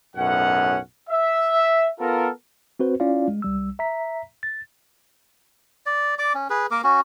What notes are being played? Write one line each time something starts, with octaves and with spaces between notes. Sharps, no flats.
B1 F#2 A2 C#4 F#5
E5
B3 F4 A4 A#4
C4 F#4 B4 C5
C#4 E4 F4 D5 F5
G#3
C2 G3 E6
E5 A#5 B6
A6
D5
D5 D6
C#4
G#4 B4
A#3 A#4 D6
C#4 F#4